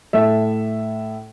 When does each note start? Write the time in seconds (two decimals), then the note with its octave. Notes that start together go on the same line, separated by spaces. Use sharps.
0.13 A2 A4 E5